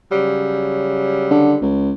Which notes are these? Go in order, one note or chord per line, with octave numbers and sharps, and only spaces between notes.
C#3 F#3 G3
D3
C#2